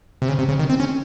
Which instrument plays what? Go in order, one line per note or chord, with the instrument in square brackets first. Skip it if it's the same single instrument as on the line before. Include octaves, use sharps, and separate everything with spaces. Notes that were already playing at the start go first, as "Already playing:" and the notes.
[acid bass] C3
C#3
C3
C#3
D#3
C4
C#4